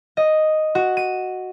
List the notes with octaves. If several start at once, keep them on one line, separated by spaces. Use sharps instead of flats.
D#5
F#4
D#7